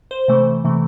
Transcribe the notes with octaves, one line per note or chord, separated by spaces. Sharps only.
C5
C3 E3 A3
C3 E3 A3